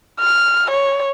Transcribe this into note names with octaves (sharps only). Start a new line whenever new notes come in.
F6
C#5